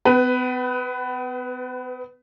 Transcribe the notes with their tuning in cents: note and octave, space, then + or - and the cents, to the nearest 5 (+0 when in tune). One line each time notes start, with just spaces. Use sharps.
B3 +40 B4 +10